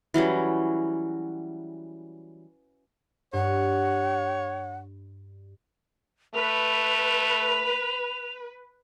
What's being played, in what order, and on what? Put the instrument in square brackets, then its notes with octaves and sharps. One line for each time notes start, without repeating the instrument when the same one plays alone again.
[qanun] E3 F#3 G3 C#4
[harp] G2 [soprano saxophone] C#5 [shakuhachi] F#5
[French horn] A3 [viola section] B4 [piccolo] F7